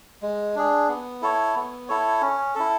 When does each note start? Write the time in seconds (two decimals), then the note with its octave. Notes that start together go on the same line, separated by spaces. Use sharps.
0.22 G#3
0.56 D4 G#4
0.89 B3
1.22 E4 A4 C#5
1.56 B3
1.89 E4 A4 C#5
2.21 C#4
2.55 E4 A4